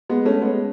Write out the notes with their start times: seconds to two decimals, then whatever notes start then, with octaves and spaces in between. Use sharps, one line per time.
0.09 G#3 B3
0.25 A3 C#4
0.42 G#3 B3